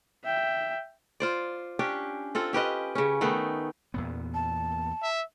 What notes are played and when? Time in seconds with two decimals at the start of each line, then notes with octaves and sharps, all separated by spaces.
0.25 E5 G5
1.20 F4 C5 D5
1.79 C#4 D4 G4
2.35 C4 F4 A4
2.53 C#4 G4 B4 D#5
2.95 C#3 C#4
3.21 D#3 A3 B3 D#4
3.94 E2 A#2 B3
4.34 A5
5.02 E5